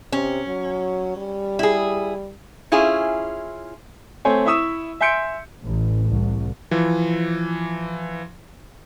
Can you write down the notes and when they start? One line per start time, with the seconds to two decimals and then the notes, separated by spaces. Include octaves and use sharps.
0.12 C3 C#4
0.47 F#3
1.17 G3
1.59 E4 G#4
2.72 C#4 E4 F4 G#4
4.25 A3 C4 C5 C#5 G#5
4.46 E4 E5 C#6 D#6 E6 E7
5.00 E5 G#5 C6 G6 C#7 D7
5.63 A1
6.08 C2
6.71 E3 F3